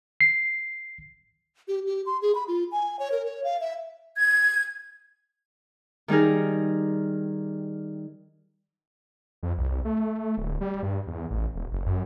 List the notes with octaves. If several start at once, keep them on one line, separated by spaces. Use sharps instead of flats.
C7
G4
G4
C6
G#4
B5
F4
G#5
C#5
A#4
C#5
F5
E5
G#6
D#3 G3 D#4 G#4 A#4
F2
C2
A3
D1
G3
G2
E2
A1
E1
F#1
F#2